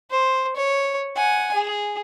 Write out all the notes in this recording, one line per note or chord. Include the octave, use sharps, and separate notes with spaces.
C5
C#5
F#5 G#5
G#4